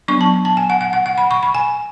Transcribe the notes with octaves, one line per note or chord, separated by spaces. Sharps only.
F#3 B3 D4 C#6
A5
A5
G#5
F#5
F#5
F#5
F#5
B5
C#6
B5
G#5